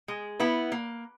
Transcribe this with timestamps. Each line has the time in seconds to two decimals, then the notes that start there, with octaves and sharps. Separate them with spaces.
0.08 G#3
0.40 B3 E4 B4
0.72 A#3